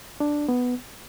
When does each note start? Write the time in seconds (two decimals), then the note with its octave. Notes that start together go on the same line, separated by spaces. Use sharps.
0.20 D4
0.48 B3